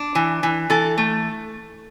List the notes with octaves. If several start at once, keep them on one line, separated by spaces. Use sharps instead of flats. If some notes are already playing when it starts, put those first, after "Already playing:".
Already playing: D4
E3
E3
E3 A4
A3